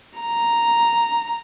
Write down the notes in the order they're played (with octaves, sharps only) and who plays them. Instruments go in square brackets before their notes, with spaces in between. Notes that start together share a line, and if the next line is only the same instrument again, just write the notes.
[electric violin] A#5